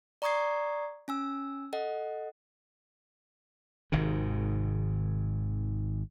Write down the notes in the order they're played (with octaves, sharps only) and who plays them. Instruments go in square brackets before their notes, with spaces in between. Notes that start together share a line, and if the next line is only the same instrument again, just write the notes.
[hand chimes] D5 A#5 C#6 D#6 G#6 C7
C#4 G#5 E6
A4 D#5 F#5
[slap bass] G#1 G#2 C3 D#3